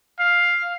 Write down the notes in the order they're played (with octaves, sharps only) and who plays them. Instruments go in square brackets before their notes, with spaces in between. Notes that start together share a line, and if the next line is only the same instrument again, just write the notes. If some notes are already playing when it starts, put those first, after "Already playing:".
[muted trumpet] F5